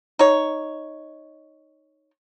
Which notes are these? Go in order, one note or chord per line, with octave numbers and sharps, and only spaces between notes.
D#4 C#5